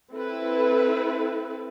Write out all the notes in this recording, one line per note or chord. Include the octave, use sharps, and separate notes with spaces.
C4 E4 A4 B4